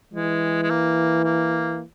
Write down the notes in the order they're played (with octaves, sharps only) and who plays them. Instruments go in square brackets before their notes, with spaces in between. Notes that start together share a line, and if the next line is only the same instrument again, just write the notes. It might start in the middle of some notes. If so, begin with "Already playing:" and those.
[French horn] E3 [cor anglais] G#3
[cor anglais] G#3
A#3
A#3